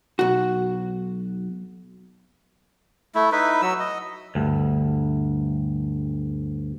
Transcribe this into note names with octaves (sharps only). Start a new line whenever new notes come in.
B1 F#4
A3 E4
D#4 E4 B4
F#3 E6
D#5
D2 G2